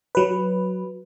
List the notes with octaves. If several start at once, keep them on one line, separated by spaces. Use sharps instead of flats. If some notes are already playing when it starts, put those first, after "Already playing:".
F#3 B4